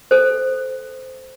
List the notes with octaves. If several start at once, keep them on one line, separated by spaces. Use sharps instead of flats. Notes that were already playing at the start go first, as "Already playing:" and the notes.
A4 C5